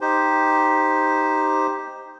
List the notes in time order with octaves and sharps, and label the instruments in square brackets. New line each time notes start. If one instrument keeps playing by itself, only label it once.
[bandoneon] D#4 G4 C5